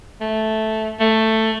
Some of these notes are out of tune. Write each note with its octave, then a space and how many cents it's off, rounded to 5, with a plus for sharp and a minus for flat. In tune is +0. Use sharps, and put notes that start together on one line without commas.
A3 -5
A3 +10